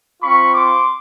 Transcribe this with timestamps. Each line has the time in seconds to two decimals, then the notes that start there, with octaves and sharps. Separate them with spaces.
0.22 C4 F4 B5 C#6
0.54 C6 D6